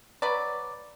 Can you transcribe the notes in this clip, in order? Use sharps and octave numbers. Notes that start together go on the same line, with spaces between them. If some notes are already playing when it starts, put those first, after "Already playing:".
F#3 B4 D5